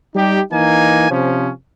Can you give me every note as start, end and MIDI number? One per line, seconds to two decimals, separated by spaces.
0.15 0.41 55
0.15 0.41 63
0.15 0.41 67
0.51 1.07 52
0.51 1.07 58
0.51 1.07 63
0.51 1.07 80
1.09 1.49 48
1.09 1.49 53
1.09 1.49 61